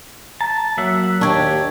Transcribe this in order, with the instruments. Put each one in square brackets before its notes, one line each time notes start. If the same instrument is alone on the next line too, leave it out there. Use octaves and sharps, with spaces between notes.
[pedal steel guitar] A5 [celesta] A#5 A6
[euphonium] F#3 [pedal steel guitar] A#3 E5 F#5
[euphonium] D#2 [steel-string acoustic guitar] D4 G4 C#5 [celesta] A5 C#6 G#6